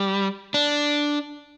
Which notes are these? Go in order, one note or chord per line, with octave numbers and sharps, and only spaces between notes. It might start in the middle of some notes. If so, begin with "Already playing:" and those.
Already playing: G3
D4